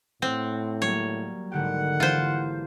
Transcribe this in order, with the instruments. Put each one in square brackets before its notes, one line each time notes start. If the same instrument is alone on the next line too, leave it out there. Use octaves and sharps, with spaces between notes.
[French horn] A2 [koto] C4 [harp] F#5
[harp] F#3 G3 A#3 [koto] C#5
[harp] G#1 D3 G4 [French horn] D#3 [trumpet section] F#5
[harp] E3 E7 [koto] F4 C5